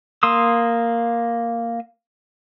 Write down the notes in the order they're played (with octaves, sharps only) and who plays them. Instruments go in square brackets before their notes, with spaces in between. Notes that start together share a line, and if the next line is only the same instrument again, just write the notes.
[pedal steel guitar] A#3 C6 D#6 E6